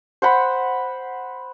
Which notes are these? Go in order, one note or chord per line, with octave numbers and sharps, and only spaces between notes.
C5 F#5 B5